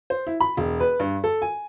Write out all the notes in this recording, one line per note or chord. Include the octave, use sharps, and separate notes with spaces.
C5
E4
B5
E1
B4
G2
A4
G#5